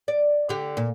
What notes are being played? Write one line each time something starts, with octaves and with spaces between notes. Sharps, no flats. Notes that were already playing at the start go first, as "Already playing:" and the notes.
D5
D3 G4
A#2